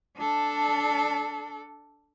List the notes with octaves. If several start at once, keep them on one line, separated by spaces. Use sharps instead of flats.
D4 A4